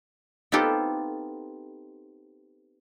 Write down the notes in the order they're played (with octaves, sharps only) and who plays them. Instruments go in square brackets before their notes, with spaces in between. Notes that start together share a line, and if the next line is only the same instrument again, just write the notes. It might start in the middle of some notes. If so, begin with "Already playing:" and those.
[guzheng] B3 C4 D#4 F4 G4 A4